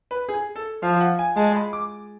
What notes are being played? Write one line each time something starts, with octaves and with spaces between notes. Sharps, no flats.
B4
G#4
A4
F3 F5
F#5
G#5
G#3 A5
A5
B5
D6